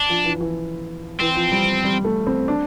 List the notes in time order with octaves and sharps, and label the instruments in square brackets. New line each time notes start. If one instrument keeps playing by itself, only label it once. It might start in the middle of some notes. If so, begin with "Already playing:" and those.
Already playing: [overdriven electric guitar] D4
[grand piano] F3
E3
E3
[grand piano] E3 [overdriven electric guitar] C4
[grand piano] F3
G3
G3
A3
C4
D4